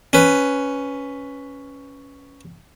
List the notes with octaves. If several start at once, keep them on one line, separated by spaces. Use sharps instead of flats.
C#4 B4